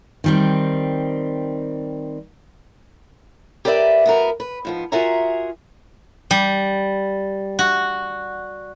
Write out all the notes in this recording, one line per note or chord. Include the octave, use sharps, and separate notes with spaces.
D#3 G3 C4
G4 A#4 B4 D5 E5
B3 F#4 A#4
B4
G#2 F3 B3
F4 F#4 G#4 A#4 E5 A#5
G3
F#4